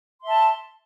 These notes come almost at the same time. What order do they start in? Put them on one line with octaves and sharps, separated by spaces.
C6 E5 A5